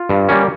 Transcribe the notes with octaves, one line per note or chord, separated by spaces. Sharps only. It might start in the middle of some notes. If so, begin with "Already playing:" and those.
Already playing: F4
G2
G3 A#3 C#4